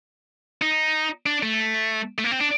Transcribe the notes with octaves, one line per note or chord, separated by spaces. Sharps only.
D#4
D4
A3
A3
A#3
C4
D4